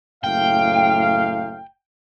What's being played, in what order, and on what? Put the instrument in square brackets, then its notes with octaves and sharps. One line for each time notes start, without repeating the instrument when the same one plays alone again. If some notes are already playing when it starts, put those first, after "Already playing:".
[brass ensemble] F#1 A2 F5 [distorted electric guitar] G5